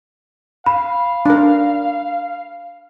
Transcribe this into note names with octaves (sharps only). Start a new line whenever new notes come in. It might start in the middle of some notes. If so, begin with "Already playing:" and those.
F5 B5
D4 A#4